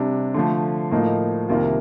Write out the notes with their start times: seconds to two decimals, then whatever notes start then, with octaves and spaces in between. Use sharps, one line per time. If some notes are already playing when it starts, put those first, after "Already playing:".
Already playing: C3 G3 D4
0.34 D3 F3 A3
0.91 A2 F3 A#3 D#4
1.49 C2 C3 D#3 A#3 F4